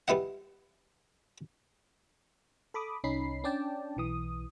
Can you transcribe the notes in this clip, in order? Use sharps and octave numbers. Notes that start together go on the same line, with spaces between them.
G3 B3 E4 D#5 F#5
A4 B5 D6 D#6
C2 C#4 D#4 B5 C7
C#4 D4 D5 G5 A5
B1 E3 D#6